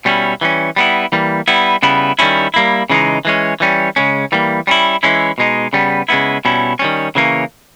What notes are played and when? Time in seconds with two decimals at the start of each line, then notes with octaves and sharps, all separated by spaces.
0.05 B2 G3 C#4 E4
0.41 E3 G3 C#4
0.76 G3 B3 E4
1.12 E3 G3 A#3
1.48 G3 B3 E4
1.83 C#3 G3 B3 E4
2.19 D#3 G3 C#4 E4
2.54 G3 A#3 E4
2.90 C#3 E3 G#3 D#4
3.25 E3 G#3 C#4
3.60 E3 G3 C#4
3.96 C#3 G#3 C#4
4.32 E3 G3 A#3
4.67 G3 C#4 E4
5.03 E3 G#3 C#4 E4
5.38 B2 G#3 D#4
5.73 C#3 G3 B3
6.09 C#3 G#3 B3 E4
6.45 B2 G3 C#4 E4
6.79 D#3 G3 C#4
7.15 C#3 E3 A#3 C#4